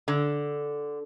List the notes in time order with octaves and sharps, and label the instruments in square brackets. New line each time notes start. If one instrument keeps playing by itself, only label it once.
[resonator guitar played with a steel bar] D3